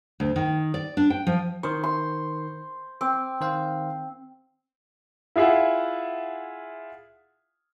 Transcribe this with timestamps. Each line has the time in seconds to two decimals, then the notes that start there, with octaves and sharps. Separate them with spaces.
0.20 D2
0.36 D#3
0.74 D5
0.97 D4
1.10 G5
1.27 F3
1.63 D#3 A#4 C5 C#6
1.84 C6
3.01 C4 D6
3.41 D#3 C5 F5
5.36 E4 F4 G#4 E5 F#5